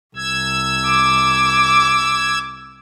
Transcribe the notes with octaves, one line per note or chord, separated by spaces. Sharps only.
C2 E6 G#6
D6